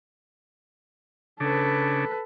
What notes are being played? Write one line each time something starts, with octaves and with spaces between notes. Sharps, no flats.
C#3 D4 A4 B4